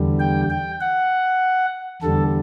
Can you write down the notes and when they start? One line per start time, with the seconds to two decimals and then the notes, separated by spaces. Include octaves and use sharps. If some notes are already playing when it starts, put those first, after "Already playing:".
Already playing: E2 D3 G3
0.20 G5
0.50 G5
0.81 F#5
2.02 E2 D3 G3 A4